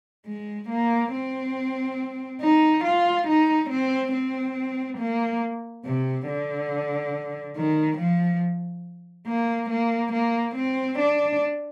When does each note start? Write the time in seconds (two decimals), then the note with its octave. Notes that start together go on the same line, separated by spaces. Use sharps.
0.27 G#3
0.70 A#3
1.13 C4
2.41 D#4
2.85 F4
3.28 D#4
3.70 C4
4.13 C4
4.98 A#3
5.85 C3
6.28 D3
7.56 D#3
7.99 F3
9.27 A#3
9.70 A#3
10.13 A#3
10.56 C4
10.99 D4